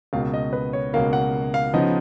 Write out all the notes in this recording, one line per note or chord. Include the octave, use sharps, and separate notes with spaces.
C#2 B2 A#3 F5
D#5
B4
C#5
C#2 B2 A#3 F5
F#5
F5
C#3 F3 B3 D#4 D#5